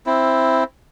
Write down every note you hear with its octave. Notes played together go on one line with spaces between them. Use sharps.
C4 E4